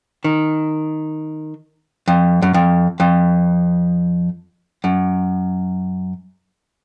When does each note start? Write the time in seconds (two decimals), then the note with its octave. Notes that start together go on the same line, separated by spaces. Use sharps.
0.24 D#3
2.08 F2
2.42 F#2
2.54 F2
3.00 F2
4.84 F#2